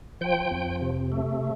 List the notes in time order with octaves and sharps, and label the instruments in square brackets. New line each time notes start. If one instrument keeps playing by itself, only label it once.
[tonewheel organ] F3 G5
F2
C3
A3